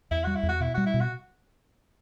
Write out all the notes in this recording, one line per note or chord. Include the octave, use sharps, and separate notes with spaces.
E2 E4
G3 F#4
E4
E2
F#4
B2 E4
G3 F#4
E4
B2
F#4